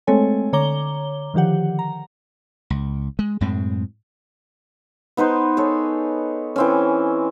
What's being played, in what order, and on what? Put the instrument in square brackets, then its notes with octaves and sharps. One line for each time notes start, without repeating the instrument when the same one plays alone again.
[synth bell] G#3 A3 C4 A4 C#5 G#5
D3 C#5 A#5 D6 G7
D3 D#3 F3 G4 F#5
A#5
[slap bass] C#2
G#3
F#2 A2 G#3 C4
[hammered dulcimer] B3 D#4 B4 C5
G#4 A4 C#5
E3 C4 C#4